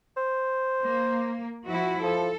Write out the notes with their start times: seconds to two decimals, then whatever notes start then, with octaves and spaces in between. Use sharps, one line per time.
0.17 C5
0.83 A#3
1.66 F3 E4 F#4
2.03 F3 A4